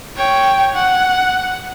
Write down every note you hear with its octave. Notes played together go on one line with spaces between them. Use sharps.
C#5 G5
F#5